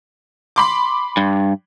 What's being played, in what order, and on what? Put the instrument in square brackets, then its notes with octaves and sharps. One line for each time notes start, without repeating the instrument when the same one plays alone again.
[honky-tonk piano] B5 C6 D6
[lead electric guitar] G2